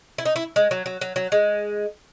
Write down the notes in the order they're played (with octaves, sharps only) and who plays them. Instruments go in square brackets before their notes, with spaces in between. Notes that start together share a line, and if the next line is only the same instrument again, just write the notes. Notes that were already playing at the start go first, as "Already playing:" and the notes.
[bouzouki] E4
D#4
E4
G#3
F#3
F#3
F#3
F#3
G#3